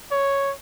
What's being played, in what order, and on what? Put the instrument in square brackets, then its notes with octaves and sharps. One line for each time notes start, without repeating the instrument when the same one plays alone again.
[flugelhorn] C#5